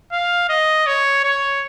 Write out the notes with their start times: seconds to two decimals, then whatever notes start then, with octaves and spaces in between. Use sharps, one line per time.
0.12 F5
0.49 D#5
0.86 C#5
1.24 C#5